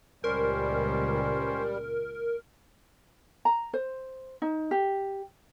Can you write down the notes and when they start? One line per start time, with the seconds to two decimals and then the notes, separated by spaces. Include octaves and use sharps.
0.24 C#2 A#2 G3 C#4 A#4 C5
3.45 A#5
3.73 C5
4.42 D#4
4.71 G4